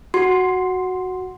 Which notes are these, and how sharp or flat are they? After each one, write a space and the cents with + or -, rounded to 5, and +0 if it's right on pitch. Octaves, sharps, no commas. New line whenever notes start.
F#4 +0 C6 +0